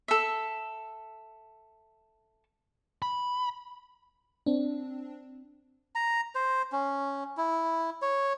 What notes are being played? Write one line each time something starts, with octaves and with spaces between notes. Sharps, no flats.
A4 E5
B5
C4 D4
A#5
C5
C#4
E4
C#5